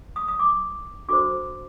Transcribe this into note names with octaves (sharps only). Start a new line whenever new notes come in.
D#6
D#6
D6
D4 F#4 A4 C5 D6